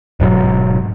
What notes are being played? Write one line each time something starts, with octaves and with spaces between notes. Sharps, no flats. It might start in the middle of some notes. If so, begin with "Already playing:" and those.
D1 G#2 B2 F#3